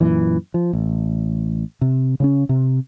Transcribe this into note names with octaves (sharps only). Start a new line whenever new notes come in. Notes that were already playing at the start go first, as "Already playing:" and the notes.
F#2 A#2 E3
F3
A1
C3
C#3 C4 C#4
C3